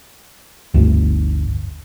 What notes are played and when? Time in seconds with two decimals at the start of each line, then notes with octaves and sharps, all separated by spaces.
0.74 G1 D2